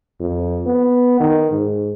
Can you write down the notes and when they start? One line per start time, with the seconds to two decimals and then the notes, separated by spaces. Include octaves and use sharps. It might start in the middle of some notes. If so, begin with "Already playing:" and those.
0.20 F2
0.66 B3
1.20 D#3
1.52 G#2